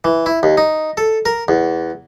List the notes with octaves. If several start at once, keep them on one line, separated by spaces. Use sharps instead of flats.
E3
E4
D#2
D#4
A4
A#4
E2